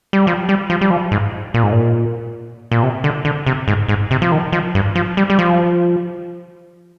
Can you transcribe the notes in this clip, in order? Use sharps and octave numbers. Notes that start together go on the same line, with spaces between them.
G3
F3
G3
F3
G3
F3
G#2
A#2
G#2
A#2
A#2
C3
D3
D3
C3
G#2
G#2
C3
F3
D#3
F3
G2
F3
G3
G3
F3